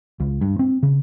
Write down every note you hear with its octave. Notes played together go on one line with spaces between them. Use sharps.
C#2
G2
C4
C#3